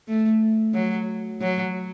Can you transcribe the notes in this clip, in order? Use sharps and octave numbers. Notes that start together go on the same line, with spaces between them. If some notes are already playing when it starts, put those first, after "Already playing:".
A3
F#3
F#3